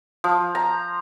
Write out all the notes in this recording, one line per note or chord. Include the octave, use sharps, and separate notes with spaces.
F3
A#5